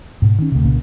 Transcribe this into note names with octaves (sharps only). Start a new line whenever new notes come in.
G#2 B2
D#3 C#4
D2 C3
C2 A#2 C#3 A#3